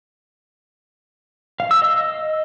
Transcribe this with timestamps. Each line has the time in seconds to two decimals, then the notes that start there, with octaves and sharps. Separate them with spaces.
1.60 F5
1.71 E6
1.82 D#5